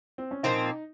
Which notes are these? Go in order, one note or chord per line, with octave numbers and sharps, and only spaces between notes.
C4
C#4
A#2 F3 C4 D#4